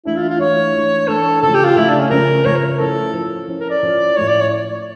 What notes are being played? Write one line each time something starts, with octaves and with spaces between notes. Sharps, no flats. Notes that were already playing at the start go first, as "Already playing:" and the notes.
E3 A3 D4 E4
F4
F4
E3 A3 D4 C#5
E3 A3 D4
E3 A3 D4 A4
C#3 F3 A3 A4
G4
F4
C#3 F3 A3 E4
D4
C#4
C#3 F3 A3 A#4
C#3 F3 A3 C#5
A#4
A#4
F3 C#4 E4 A4
F3 C#4 E4
F3 C#4 E4
A#4
D5
F3 C#4 E4
A2 F3 A3 C#5
D5
C#5